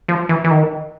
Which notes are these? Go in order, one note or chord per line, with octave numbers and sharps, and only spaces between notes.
F3
E3
E3
D#3